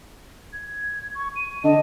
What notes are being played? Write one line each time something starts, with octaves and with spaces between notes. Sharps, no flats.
G#6
C#6
D#7
D3 D#5 A5